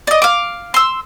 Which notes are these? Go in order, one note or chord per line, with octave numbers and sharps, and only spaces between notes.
D5 D#5
F5 D6
C6 E6